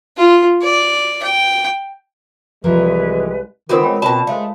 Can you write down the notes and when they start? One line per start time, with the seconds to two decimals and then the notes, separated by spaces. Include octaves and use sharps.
0.17 F4
0.62 D5
1.23 G5
2.64 C2 E3 F3 G#3 A#4 B4
3.69 D#3 E3 B3 C4 F4 A#4 D#6
3.81 G#3 C#5 G5 B5
4.02 B2 C4 A5 B5
4.27 G#3 A3 C5 F5